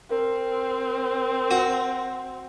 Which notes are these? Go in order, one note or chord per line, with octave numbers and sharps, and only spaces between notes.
C4 A#4
F#4